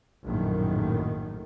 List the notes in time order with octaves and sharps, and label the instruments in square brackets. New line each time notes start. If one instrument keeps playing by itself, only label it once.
[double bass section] A#1 F#2 A2 D#3